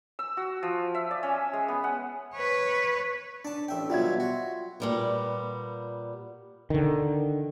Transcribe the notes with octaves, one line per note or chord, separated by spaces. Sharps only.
E6
F#4
F3
E5
D5
C#4
G#3
B3
F#5
B4 C#5
D4 D5 A5
A1 E5 G5
B2 F#3 G3 F4 E5 G#6
F#4
A#2 G3 B3
D3 D#3